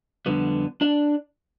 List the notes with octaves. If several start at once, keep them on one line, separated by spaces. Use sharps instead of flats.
F2 D3 G3 B3
D4 D5